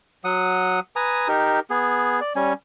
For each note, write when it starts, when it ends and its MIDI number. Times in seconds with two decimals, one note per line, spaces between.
0.24 0.80 54
0.24 0.80 78
0.24 0.80 87
0.96 1.28 71
0.96 1.28 80
0.96 1.28 82
0.96 1.28 87
1.28 1.60 63
1.28 1.60 67
1.28 1.60 70
1.70 2.20 59
1.70 2.20 68
2.21 2.33 74
2.36 2.53 55
2.36 2.53 61
2.36 2.53 80